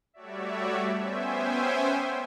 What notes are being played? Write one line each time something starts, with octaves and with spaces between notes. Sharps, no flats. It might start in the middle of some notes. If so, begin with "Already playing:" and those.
G3 A3 F#4 C#5 D5 E5
B3 C#4 C5 E5 G5 G#5